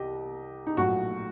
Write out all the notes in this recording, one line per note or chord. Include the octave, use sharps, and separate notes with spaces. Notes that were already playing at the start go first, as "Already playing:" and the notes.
Already playing: C2 G4 D#5
D#4
A#1 A2 F#3 F#4